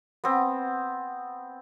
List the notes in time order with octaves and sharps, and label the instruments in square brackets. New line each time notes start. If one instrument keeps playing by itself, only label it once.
[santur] B3 C4